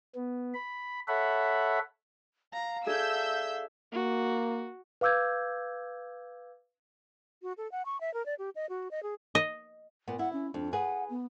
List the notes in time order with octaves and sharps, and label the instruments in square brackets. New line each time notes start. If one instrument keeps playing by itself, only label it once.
[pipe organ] B3
B5
A4 C#5 E5 F#5 B5
[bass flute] F5 [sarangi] A#5
[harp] D4 G#4 A4 [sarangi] E5 [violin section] E6 G6
[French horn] A#3 [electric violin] F#4
[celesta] B4 F5 D6 E6 G6 G#6
[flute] F#4
A4
F#5
C#6
E5
A#4
D5
G4
D#5
F#4
D#5
G#4
[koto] D#5
[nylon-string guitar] A#2 B3
[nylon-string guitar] E4 [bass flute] F#5
[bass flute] C#4
[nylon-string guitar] F2 [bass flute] D4
[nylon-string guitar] G#4 B4 [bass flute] F#5
[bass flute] B3